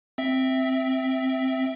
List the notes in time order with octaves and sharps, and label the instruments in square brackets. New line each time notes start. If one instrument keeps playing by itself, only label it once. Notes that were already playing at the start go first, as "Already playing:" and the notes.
[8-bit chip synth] C4 E5